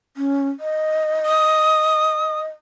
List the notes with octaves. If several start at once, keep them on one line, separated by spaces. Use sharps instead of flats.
C#4
D#5
D#6